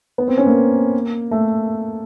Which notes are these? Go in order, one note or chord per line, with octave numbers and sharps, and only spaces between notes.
B3
C4
C#4
A#3
A3